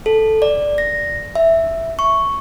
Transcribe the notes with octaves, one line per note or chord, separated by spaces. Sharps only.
A4
D5
A#6
E5
C#6